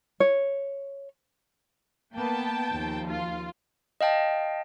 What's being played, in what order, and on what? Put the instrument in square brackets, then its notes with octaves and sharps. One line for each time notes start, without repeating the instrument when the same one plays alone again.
[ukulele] C#5
[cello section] A#3 B3 [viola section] G5 A5
[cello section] D#2 F3
[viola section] F4
[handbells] D#5 F5 G5 A5